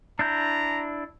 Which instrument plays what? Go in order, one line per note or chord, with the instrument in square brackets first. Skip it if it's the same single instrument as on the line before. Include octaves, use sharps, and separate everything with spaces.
[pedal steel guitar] D4 E4 G6 [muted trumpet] A#5